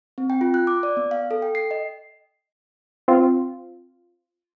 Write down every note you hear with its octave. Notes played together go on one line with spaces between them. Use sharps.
C4
G5
F4
F#6
D6
D5
B3
F5
A4
G5
C7
D#5
C4 F4